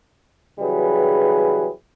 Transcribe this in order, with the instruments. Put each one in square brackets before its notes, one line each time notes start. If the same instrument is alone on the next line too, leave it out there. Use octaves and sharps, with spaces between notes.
[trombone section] C#3 E3 F#3 G3 G#4 B4